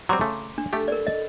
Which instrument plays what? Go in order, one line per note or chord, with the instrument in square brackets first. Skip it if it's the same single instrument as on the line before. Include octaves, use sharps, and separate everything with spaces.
[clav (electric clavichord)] F#3 G3 C4 [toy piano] A#5 C6 D6
[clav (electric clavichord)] C#3 A3
[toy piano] D4
[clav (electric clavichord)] A3 G4 [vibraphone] A4
[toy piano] A#4 D5
D#5